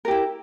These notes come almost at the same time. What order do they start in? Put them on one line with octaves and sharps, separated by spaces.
A#4 G4 E4